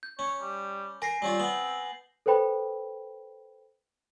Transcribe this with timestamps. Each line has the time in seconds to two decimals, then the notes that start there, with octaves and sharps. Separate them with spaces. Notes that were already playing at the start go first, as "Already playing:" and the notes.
0.03 G6
0.19 C#4 C#5
0.41 G3
1.02 A#4 G#5 A#6 C7
1.22 G3 C4 C#4 F4
1.40 B3 F#7
2.26 A4 B4 C5 G5 B5